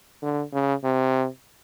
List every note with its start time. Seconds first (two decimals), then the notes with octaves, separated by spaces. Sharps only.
0.22 D3
0.53 C#3
0.84 C3